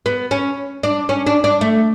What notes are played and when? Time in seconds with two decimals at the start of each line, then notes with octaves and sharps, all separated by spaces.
0.06 B3
0.31 C#4
0.83 D4
1.09 C#4
1.27 D4
1.44 D4
1.61 A3